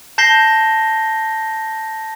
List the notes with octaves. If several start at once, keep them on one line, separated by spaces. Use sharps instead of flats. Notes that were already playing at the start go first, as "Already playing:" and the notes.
A5 G6 A#6 C7 G7